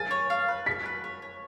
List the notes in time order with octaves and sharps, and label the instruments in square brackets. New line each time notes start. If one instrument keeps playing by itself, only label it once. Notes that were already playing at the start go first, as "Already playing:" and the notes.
Already playing: [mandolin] G#5 [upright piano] A6
[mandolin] C#5
F5
B4
[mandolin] F#4 [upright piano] B6
[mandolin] B4
C#5
C#5